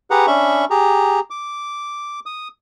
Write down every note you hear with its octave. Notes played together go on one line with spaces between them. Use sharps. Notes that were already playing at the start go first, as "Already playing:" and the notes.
G4 G#4 B4 F#5 A#5
C#4 D4 E5 B5 C#6
G4 G#4 A#5
D6
D#6